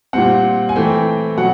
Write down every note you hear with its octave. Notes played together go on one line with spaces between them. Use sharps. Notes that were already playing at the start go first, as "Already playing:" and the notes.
A#2 G3 C4 F#5
G#5
E3 A3 C4 G5
B2 F#3 F#5